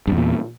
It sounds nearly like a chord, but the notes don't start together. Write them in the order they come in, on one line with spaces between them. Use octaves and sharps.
G2 E2 A#2